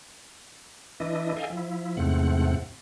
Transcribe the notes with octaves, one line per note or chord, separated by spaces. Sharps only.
E3 D4 E4 D#5
A4 D#5 F5 G5 G#5
F3 E4
E2 G#2 C3 A3 C4 F#5